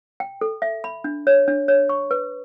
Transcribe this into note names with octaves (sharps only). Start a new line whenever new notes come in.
G5
A4
E5
B5
D4
C#5
D4
C#5
C#6
B4